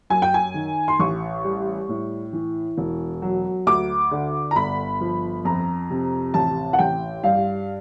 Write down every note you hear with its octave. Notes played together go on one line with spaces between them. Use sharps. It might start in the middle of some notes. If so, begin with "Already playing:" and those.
F#2 G#5
G5
G#5
D#3
C6
A1 C#6
G3
A2
E3
E1
F#3
D2 D6
D3
A#5
G1 B5
F3
F2 A#5
C3
A1 A5
F#5
A1 G5
G2 F5